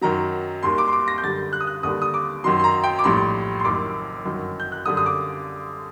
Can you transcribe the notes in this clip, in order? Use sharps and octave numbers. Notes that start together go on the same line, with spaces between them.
F#2 D#3 F#3 A#5
D#2 D#3 G3 C6
D6
C6
D6
A#6
G6
F#2 D3 G3 A6
F#6
D#6
F#6
D#2 D3 G3 D#6
D#6
D6
F#2 D#3 F#3 C6
C6
A#5
G5
D6
A#1 A2 G3 C6
C6
F#1 F#2 D#3 D6
G1 F#2 D#3 F#3
G6
F#6
F#2 D3 G3 D#6
D#6
D6